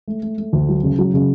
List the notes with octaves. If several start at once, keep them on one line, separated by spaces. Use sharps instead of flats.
A3
A3
A3
D2
F#3
C#3
F#3
C#3